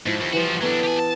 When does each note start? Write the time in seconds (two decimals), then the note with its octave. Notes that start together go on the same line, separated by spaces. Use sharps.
0.06 G#2 F3 E4 C#6
0.21 D#2
0.33 E3 F3 F#4 G4
0.62 F#3 B3 D4 A4
0.85 G4 G#5
1.00 A5